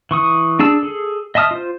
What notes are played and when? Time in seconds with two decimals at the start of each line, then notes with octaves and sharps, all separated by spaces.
0.11 E3 C#6 D#6
0.59 D4 G#4 A5 E6
0.83 G#4 A4
1.35 D#5 E5 A5 D#6 F6
1.51 F4 C5